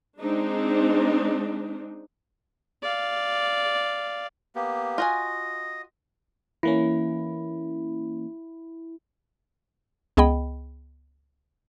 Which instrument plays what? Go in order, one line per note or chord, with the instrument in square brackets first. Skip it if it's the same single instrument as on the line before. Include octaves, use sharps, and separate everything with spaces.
[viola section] G#3 C4 D4 D#4
[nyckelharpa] D5 F5
[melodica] A#3 B3 G4
[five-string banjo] F4 F#4 G#5 [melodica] D#5
[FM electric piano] E3 A#3 C#4 [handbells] E4
[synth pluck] C#2 B3 G#4 D#5 G5 B5